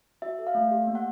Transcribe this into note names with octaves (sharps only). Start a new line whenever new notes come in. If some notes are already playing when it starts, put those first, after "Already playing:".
F#4 E5
A4
F5
A3
G4
A#3
F#5